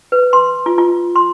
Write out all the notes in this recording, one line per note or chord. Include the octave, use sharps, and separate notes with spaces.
B4
C6
F4
F4
C6